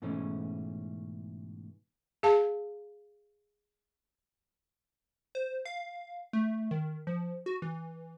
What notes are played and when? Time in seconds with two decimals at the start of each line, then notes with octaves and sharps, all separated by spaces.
0.02 G#2 B2 E3 A3 C#4
2.23 G#4 F5 A5
5.35 C5
5.65 F5
6.33 A3
6.71 D#3
7.07 F3
7.46 F#4
7.62 E3